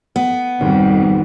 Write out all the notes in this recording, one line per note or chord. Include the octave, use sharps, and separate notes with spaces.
B3
G#1 F2 G3